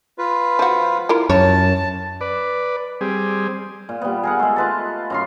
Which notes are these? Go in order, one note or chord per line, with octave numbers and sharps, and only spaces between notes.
F4 B4
F3 F#4
E4 F4 A#4
F#2 C#5 A5
B4 D5
G3 C4 G#4
A#2
G3 B3
G#4 A#4 F#5
G#3 A3
F4 B4 A5
F#2 F5 C6